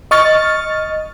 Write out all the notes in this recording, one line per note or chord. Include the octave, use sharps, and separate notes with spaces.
D#5 C#6 F6 A6